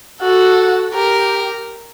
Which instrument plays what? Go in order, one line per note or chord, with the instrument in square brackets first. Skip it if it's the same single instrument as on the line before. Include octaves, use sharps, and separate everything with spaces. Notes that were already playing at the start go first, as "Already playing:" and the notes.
[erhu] F#4 [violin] A4
[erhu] G4 [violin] A#4